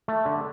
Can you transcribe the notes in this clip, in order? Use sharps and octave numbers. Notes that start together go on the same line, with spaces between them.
A3
D3